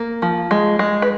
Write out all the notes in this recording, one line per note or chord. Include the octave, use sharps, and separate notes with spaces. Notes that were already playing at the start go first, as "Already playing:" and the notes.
Already playing: A#3
F3
G#3
G#3
B4